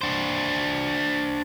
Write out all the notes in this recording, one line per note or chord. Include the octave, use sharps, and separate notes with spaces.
D4 C5